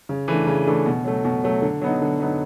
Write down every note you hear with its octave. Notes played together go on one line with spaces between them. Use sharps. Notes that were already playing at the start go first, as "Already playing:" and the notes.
C#3
E3 A3 D4
C#3
E3 A3 D4
B2
F#3 A3
B2
F#3 A3
D3
F#3 B3 D#4
D3
F#3 B3 D#4